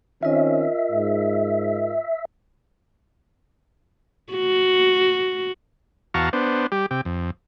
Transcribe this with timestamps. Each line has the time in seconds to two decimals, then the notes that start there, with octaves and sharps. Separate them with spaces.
0.23 D#3 C4 C#4 F4 A#4 D#5 E5
0.91 G#2
4.33 F#4
6.14 E2 F#4 F5 A5 A#5 C#6
6.33 B3 D4 C5
6.72 G3 G4
6.91 C3 G4
7.05 F2